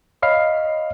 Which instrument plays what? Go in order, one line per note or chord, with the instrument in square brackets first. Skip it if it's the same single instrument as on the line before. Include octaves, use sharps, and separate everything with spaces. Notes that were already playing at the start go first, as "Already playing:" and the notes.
[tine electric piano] C#5 D#5 F5 B5 F6 C7